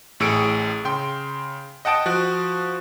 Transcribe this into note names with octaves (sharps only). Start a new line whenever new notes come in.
A1 A2 G#4 E6 C#7 D7
C#3 G5 C6
D#5 F#5 G5 A5 D#6 D7
F3 F#4 F#6